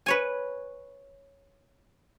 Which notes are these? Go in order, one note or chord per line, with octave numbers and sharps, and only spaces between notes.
B4 C#5 G#5